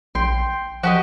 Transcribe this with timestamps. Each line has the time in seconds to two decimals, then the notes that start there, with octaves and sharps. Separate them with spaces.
0.15 A#1 G5 C6
0.83 F3 F#4 G4 D#5